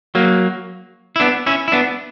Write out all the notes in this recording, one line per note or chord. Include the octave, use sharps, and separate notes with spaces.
F#3 A#3
E4
B3 D4
C#4 E4
E4
B3 D4